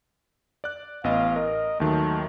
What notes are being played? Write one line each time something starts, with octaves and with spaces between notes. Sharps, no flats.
D5 F#6
A1 B3 D#5 F5
A#4 D#5
D#2 D#3 F#3 A3